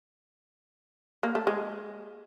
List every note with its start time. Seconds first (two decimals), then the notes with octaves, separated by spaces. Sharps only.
1.23 A#3
1.35 A3
1.47 G#3